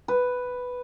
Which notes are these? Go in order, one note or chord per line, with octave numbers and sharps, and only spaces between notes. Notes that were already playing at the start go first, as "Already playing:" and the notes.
B4